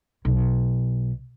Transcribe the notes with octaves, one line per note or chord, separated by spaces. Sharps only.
B1